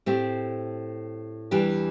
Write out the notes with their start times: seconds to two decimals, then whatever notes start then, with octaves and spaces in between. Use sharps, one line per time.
0.06 A2 A3 C4 G4
1.51 E2 E3 G3 D4 G4